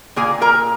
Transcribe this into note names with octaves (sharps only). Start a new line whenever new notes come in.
A#2 A#3 G#4 G#5
A#4 A#5